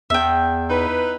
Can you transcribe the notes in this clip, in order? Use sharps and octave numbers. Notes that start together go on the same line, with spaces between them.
E2 E5 G5
D#4 E4 B4